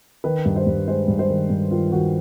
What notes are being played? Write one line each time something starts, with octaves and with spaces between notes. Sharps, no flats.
D#3 B4
G2
C5
G2
G#3 C5
G2
C5
D#3
G2
D#3 F4
D#3 F#4